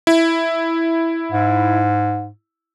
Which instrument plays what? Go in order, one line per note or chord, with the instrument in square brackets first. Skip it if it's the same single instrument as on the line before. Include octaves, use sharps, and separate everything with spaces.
[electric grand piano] E4
[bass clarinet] G#2